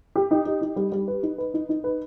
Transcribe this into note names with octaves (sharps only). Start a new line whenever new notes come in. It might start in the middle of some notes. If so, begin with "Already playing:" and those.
G4
D#4
G4
D#4
G3
G3
B4
D#4
B4
D#4
D#4
B4